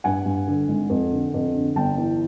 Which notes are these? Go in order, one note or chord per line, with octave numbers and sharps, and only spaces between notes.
G2 F#5 G#5
G2
D3
G#1
F2
D3
F2
D3
G1 G5 A5
E3